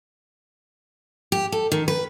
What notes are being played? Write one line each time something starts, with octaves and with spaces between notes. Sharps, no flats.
G4
A4
D#3
B4